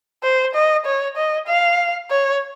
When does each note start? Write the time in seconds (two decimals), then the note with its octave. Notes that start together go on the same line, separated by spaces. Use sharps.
0.23 C5
0.55 D#5
0.86 C#5
1.17 D#5
1.47 F5
2.10 C#5